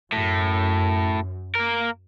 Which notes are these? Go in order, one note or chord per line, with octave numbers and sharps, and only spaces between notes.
F#2 A2
A#3 A#4